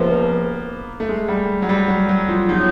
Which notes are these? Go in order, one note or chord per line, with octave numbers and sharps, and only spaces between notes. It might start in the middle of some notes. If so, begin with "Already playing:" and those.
Already playing: C#2 C3 F3 A#3 B3
A3
G#3
G3
F#3
G3
F#3
F#3
F3
C#3 F3 F#3 B3 D#4